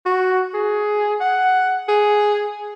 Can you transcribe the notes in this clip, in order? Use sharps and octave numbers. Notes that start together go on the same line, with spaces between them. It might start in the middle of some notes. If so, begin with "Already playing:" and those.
F#4
G#4
F#5
G#4